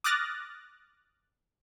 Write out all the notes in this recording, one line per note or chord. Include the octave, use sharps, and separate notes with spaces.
D6 D#6 F6 F#6 A6 A#6